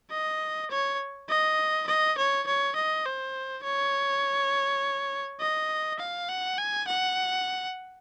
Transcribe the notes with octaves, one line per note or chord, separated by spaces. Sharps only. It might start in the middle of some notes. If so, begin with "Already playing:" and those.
D#5
C#5
D#5
D#5
C#5
C#5
D#5
C5
C#5
D#5
F5
F#5
G#5
F#5